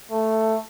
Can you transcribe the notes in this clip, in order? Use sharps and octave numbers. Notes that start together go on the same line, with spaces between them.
A3